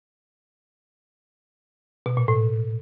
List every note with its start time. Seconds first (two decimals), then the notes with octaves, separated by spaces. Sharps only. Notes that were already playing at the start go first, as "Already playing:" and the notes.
2.06 B2
2.17 A#2
2.28 A2